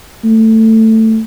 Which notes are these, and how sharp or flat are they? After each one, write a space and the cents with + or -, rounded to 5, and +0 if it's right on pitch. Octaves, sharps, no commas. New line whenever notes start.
A3 +15